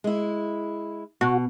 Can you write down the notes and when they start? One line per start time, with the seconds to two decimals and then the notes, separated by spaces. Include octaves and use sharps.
0.04 G#3 E4
1.21 B2 F#4